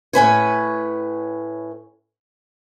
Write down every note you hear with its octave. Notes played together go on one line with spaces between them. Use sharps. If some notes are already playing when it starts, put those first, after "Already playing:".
A2 C#4 B4 C#5